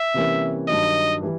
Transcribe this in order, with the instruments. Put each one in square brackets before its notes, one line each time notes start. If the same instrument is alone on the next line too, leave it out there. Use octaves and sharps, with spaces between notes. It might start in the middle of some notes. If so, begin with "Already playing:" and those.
Already playing: [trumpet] E5
[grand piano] C3 E3 G3 A#3 C#4
[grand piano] G2 D#3 F#3 [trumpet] D#5
[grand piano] E3 G3